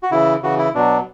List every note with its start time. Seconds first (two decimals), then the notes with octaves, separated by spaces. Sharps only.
0.03 F#4
0.11 C#3 E3 E4
0.42 C#3 E3 F#4
0.58 E4
0.75 B2 F#3 D4